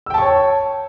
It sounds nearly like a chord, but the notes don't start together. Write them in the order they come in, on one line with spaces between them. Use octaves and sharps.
E6 G5 A5 C#6 C#5